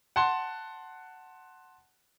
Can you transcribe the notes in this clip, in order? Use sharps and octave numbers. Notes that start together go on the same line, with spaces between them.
F#5 A5 C6